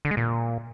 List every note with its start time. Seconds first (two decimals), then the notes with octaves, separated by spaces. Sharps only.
0.05 D3
0.11 G#3
0.17 A#2